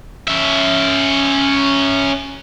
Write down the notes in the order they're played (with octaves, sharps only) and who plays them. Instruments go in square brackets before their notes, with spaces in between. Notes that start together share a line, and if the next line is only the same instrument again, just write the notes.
[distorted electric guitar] C#4 E5